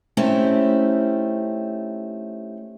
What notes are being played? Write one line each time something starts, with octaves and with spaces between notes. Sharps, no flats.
A3 C4 C#4 D#4 E4 G4